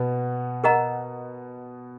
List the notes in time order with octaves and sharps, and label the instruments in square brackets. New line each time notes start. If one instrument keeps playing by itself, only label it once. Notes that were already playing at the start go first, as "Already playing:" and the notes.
Already playing: [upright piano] B2 B3
[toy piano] A#4 D#5 F#5 A#5